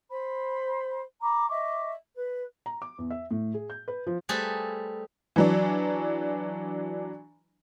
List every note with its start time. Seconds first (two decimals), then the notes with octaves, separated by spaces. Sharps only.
0.10 C5 B5
1.22 A#5 B5 D6
1.49 D#5 E5 C#6 D6
2.14 B4
2.66 A#5
2.82 D6
2.98 E2
3.11 E5
3.31 A2
3.54 G#4
3.70 G6
3.88 B4
4.07 F3
4.29 G3 A3 G#4 A4 B4 C5
5.36 E3 F#3 D4